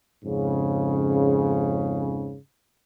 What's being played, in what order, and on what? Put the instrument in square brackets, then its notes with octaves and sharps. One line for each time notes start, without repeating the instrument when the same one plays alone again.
[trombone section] F2 G#2 C#3